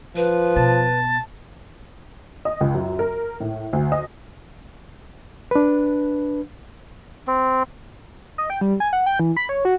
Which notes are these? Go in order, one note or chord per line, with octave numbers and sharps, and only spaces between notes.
F3 B4
B2 A5
D#5
C#2
F#2
A#4
A2
D2
D#5
D4 B4
C4
D#5
G5
G3
G#5
F#5
G5
E3
B5
C#5
F#4